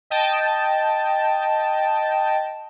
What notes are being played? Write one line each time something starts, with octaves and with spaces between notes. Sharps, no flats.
D#5 G5 A5